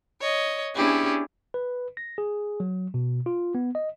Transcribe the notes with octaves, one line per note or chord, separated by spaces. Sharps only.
C#5 D#5
B3 C#4 D4 E4 G4 G#4
B4
A#6
G#4
F#3
B2
F4
B3
D#5